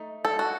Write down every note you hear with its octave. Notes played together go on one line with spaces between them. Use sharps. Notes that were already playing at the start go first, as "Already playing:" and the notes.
Already playing: A3 D#4
A4
F#4